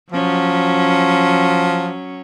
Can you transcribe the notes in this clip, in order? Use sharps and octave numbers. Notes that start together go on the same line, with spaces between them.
F3 F#3 C#4